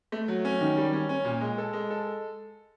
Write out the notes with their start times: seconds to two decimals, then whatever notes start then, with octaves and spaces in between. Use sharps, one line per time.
0.12 A3
0.28 F#3
0.45 C#4
0.61 D#3
0.77 G3
0.93 C#4
1.09 C#4
1.25 A#2
1.41 G#3
1.58 A4
1.73 G#3
1.91 A4